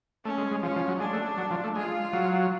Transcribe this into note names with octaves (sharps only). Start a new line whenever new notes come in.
A3 C#4
G#3
G#3
F3 C#4
F3
F#3
G#3 D4
A3
F#3
F3
A3
G#3 F4
F#3